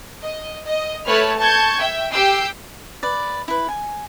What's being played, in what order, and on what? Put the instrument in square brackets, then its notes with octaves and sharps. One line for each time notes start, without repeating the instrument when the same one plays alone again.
[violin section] D#5
D#5
A3 B4 C#5 A5 B5 F6
A5 C#6 G6 G#6
E5 G5
G4 G5 E6 G6 C7 D7
[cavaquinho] B4 D5
E4 B4
G#5